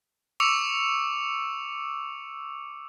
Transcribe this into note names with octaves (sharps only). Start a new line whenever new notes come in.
C#6 D6 E6 C#7 F7